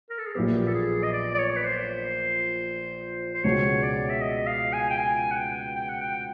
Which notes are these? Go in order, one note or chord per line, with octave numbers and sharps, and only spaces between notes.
A#4
A4
G#4
A#1 A#2 F#3 B3 G4
A4
G#4
D#5
D5
D5
C#5
B4
C5
C5
C#2 B2 G#3 C#5
D5
E5
D#5
F5
G#5
G5
G#5
F#5
G5
G5
F#5
G5